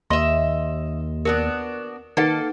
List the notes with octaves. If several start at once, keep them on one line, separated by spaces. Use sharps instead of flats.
D#2 D#5 E5 C6
B3 D4 F#4 A#4
D#3 A#3 D#4 A4 B4 F#5